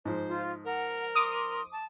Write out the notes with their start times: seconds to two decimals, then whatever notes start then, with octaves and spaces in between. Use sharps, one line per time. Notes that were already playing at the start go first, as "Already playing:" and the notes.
0.05 G#2 F3 C5
0.27 F4
0.65 A#4 F#5
1.15 C6 D6 D#6
1.73 A5